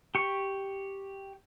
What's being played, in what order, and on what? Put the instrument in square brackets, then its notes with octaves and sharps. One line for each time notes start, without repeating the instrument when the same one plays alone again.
[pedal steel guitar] G4 C#6